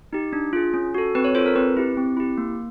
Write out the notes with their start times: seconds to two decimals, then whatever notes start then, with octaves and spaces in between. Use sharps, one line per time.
0.13 D#4 G4
0.33 D4
0.53 F4 G#4
0.74 C#4
0.94 F#4 A4
1.15 C4 B4
1.24 C#5
1.35 F4 A4 C5
1.46 A#4
1.55 C4 B4
1.77 E4 G4
1.97 C4
2.17 E4 G4
2.38 A#3